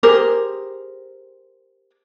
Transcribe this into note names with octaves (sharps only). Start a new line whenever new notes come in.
G4 G#4 A#4 C5